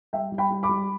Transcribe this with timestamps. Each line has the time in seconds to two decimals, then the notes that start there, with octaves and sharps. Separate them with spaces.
0.13 G3 E5 G5
0.32 G3
0.38 G5 B5
0.50 G3
0.63 B5 D6
0.69 G3